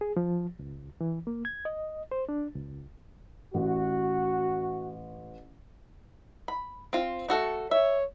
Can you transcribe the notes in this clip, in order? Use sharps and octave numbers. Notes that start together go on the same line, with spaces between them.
G#4
F3
C#2
E3
A#3
G#6
D#5
C5
D4
C#2
A1 F#4
B5
C4 F4
A3 F#4 A4
C#5 E5